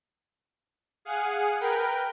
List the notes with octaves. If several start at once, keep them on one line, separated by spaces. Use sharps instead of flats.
G#4 F5 F#5 G#5
A#4 B4 G5